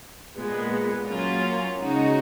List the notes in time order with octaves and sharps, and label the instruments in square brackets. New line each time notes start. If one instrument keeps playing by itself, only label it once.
[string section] A#2 G#3 B3
F#3 A#3 C#4 F4
C#3 G#3 D#4 F#4